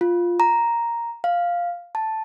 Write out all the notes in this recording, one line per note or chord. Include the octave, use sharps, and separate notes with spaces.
F4
A#5
F5
A5